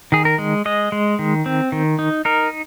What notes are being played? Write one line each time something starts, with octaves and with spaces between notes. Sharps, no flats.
D#3 G#4
A#4
G#3
G#3 D#5
G#3
D#3
C4
D#3
D#4
D#4 A#4